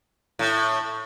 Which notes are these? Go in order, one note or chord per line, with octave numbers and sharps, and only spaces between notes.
A2